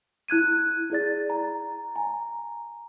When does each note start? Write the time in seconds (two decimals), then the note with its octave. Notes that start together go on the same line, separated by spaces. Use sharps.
0.28 E4 F#6 G#6 D#7
0.90 E4 G#4 D5 A6
1.30 A#5
1.96 G#5 A#5